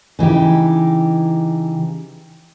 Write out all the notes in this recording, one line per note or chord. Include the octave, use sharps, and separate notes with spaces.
C#3 E3 D#4 G4